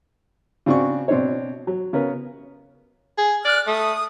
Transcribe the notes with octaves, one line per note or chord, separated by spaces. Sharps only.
C#3 C4 D4 F#4 C#6
B2 C4 D4 C5 C#5
F#3
C#3 B3 C#4 A#4 B4
G#4
D5 F6 F#6
A3 D#6